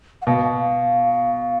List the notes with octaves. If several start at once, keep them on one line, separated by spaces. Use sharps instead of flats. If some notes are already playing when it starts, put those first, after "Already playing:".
F#5
B2 F5